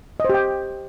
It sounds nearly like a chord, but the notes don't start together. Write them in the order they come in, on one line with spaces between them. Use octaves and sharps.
D#5 C5 G4 G5